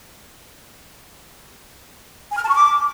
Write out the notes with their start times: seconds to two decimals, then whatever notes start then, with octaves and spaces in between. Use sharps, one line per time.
2.31 G#5
2.37 F6
2.42 A5
2.48 C#6
2.54 D6